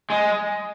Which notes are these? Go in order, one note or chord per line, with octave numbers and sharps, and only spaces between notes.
G#3